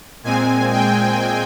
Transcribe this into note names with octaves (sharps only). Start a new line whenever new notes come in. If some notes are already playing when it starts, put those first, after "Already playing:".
A#2 G#3 C4 G#5
G5